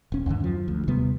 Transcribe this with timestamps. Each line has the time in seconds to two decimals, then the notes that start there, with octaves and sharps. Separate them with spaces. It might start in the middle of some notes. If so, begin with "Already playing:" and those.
0.12 D#1 C#4
0.26 D#2 G#2 B2 D3
0.40 F#2 F3
0.68 D2
0.87 D#2 C3 G3 B3